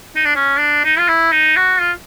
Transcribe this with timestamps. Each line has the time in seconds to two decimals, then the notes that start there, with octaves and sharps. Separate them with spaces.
0.16 D#4
0.25 D4
0.36 C#4
0.59 D4
0.85 D#4
0.98 F4
1.08 E4
1.32 D#4
1.56 F#4
1.81 F4